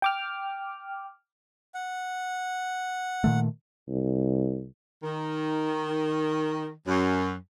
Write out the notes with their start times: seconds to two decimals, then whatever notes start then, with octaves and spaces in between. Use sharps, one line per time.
0.02 G5 D6 F6
1.74 F#5
3.24 A#2 D#3 A3
3.89 C2
5.03 D#3
6.87 F#2